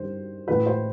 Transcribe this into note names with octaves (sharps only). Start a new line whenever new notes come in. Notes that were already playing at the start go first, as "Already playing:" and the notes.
Already playing: G2 D#3 G3 C5
A2 E3 G#3 B4
C5